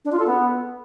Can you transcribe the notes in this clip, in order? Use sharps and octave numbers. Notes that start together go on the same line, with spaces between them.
D4
F4
A4
B3